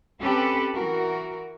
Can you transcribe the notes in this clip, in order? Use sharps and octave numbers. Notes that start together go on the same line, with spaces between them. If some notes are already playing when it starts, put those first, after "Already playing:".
C4 C#4 G4 A4 B4
E3 F#4 A#4